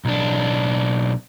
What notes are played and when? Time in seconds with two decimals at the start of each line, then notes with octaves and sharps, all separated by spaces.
0.05 B1 D4